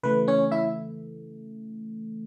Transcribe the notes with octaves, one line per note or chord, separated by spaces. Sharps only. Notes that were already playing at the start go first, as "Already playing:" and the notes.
C#3 E3 A3 B4
C#4 C#5
E4 E5